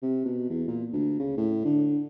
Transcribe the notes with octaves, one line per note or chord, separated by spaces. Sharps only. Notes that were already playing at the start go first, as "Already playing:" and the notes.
C3
B2
E2
A#2
D2
C#3
A2
D3